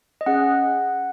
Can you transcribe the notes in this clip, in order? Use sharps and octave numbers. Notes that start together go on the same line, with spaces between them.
D#5
C#4 G#4 F#5